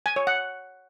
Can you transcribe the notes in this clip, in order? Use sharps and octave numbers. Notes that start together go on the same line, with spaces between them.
G#5
C#5
F#5